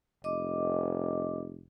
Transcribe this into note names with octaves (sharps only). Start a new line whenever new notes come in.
F1 D#5 D6